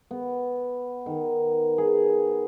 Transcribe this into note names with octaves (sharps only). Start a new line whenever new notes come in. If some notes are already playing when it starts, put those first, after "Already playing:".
B3
D#3
G#4